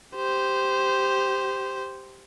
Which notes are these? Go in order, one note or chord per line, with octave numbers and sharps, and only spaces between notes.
G4 C5